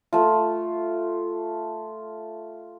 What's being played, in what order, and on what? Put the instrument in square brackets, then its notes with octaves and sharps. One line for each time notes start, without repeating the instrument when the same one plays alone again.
[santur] A3 F4